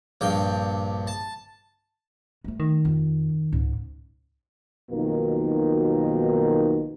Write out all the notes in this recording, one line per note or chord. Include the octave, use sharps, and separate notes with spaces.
A#1 G2 G5
A5
G#3 A3
D#3
F2
C#2 G#2
B1 F2 B2 D#3 A#3